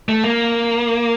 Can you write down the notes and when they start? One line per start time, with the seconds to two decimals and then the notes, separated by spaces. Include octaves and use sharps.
0.09 A3
0.24 A#3